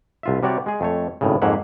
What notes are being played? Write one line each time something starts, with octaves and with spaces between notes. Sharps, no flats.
C2 F4 E5
C3 G3 F#4 C#5 D5
G#3 G#4
F2 A3 C#5
G#1 A2 C#3
F2 G#2 A#3 C#5 E5 F#5